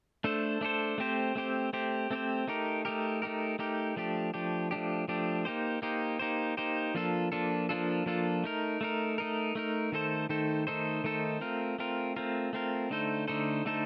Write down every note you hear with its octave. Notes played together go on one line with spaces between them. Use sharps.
A3 D4 A4 C5
A3 D4 A4 C5
A3 C4 G4 C5
A3 C4 G4 C5
A3 C4 G4 C5
A3 C4 G4 C5
A3 D#4 G4 A#4
A3 D#4 G4 A#4
A3 D#4 G4 A#4
A3 D#4 G4 A#4
F3 A3 D4 G4
F3 A3 D4 G4
F3 A3 D4 G4
F3 A3 D4 G4
A#3 D#4 G4 C5
A#3 D#4 G4 C5
A#3 D#4 G4 C5
A#3 D#4 G4 C5
F3 A#3 D4 F4 A4
F3 A#3 D4 F4 A4
F3 A#3 D4 F4 A4
F3 A#3 D4 F4 A4
A3 D#4 A#4
A3 D#4 A#4
A3 D#4 A#4
A3 D#4 A#4
D#3 A3 D#4 A4 C5
D#3 A3 D#4 A4 C5
D#3 A3 D#4 A4 C5
D#3 A3 D#4 A4 C5
A3 C4 F4 A#4
A3 C4 F4 A#4
A3 C4 F4 A#4
A3 C4 F4 A#4
D3 A3 D#4 A4 C5
D3 A3 D#4 A4 C5
D3 A3 D#4 A4 C5